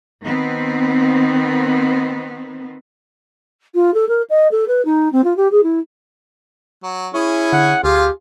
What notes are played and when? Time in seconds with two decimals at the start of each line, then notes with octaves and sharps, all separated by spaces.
0.22 D#3 B3 C4
3.75 F4
3.94 A4
4.09 A#4
4.30 D#5
4.51 A4
4.68 B4
4.85 D#4
5.12 C4
5.24 F4
5.37 G4
5.52 G#4
5.63 E4
6.83 F#3
7.14 C#4 E4 G#4 C#5
7.53 D3 F#5
7.84 D2 F4 G4 G#4 F5